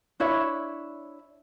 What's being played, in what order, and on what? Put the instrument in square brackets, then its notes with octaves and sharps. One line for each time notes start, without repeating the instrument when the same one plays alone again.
[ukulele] D4 E4 C#5 E5